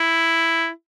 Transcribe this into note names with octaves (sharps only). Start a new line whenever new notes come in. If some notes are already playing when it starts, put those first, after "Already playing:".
Already playing: E4